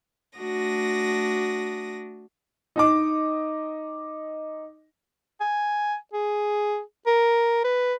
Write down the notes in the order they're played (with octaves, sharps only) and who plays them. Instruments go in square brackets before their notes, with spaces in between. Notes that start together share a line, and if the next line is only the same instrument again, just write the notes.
[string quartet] A3 D4 F#4 D#6 A#6
[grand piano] D#4 D#5 D6
[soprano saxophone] G#5
G#4
A#4
B4